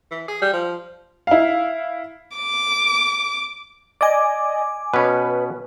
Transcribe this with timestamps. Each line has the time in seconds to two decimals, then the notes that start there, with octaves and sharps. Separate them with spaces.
0.11 E3
0.28 G#4
0.42 G3
0.53 F3
1.27 E4 F5
2.37 D6
4.01 D5 D#5 G#5 D6
4.94 B2 C#4 B4